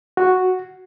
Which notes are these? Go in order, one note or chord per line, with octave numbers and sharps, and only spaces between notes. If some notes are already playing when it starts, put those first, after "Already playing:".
F#4